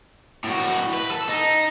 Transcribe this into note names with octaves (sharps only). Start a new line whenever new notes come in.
A2 F#4
B4
A4
D#4